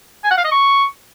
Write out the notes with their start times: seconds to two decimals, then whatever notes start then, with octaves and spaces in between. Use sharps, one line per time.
0.24 G#5
0.31 F#5
0.38 F5
0.44 D#5
0.51 C#6